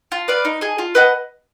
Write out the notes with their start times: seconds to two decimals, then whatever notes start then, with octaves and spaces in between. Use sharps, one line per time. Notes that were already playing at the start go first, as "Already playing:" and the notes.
0.12 F4
0.28 B4 D5 F5
0.45 D#4
0.61 G#4 D#5
0.78 F4
0.95 B4 D#5 F#5